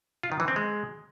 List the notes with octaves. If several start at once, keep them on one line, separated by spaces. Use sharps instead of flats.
F4
D#3
E3
C4
G#3